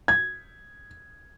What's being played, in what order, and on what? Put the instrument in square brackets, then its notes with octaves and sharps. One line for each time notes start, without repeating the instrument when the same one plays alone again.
[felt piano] G#6